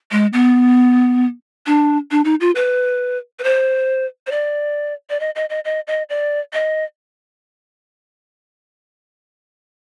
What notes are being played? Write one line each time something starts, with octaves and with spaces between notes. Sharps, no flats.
G#3
B3
D4
D4
D#4
F4
B4
B4
C5
C5
D5
D5
D#5
D#5
D#5
D#5
D#5
D5
D#5